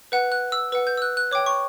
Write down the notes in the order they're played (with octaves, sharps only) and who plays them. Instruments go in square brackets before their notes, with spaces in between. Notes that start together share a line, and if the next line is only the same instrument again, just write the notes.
[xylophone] B4 F#5 F#6
F#6
E6
B4 F#5 E6
G6
E6
F#6
F#6
C#5 G5 D6
C#6